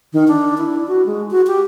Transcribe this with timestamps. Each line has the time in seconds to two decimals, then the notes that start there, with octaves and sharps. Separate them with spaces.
0.13 D#3
0.28 D4
0.58 E4
0.88 F#4
1.06 G#3
1.31 F#4
1.47 G4